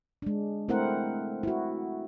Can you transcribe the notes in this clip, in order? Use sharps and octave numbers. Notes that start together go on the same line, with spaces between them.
G#3 D4
A3 C4 E4 A#4 C5 F#5
E4 F#4